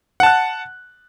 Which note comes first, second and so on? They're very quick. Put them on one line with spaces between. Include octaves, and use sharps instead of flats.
F#5 A5 F#6